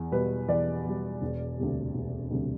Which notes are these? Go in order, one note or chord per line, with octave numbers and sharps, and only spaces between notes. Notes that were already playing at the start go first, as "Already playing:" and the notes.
Already playing: E2
B2 G3 B4
E2 D5
B2 G3
E1
D2 C3 G3
E1
D2 C3 G3